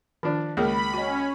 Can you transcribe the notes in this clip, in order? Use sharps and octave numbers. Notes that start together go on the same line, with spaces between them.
D#3 F3 D4
C#2 A#3 G#4 A#4 B5
C#4 F#4 D#5